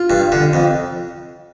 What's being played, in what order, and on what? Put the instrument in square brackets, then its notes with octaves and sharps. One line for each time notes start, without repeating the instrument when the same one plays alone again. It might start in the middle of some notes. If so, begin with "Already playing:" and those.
Already playing: [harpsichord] F4
G2
D3
F2